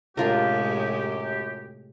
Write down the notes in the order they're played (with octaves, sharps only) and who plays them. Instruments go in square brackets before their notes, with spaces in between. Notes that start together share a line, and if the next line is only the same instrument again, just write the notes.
[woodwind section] F#2 G4 [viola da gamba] A2 C3 G#3 [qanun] D4 F4 A#4